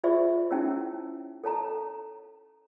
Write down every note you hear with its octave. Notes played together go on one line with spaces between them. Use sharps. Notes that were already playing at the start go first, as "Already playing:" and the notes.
F4 G#4 C5 D5 E5 C#6
C#4 D#4 E4 G#4 C#5 E6
A4 C#5 A5 A#5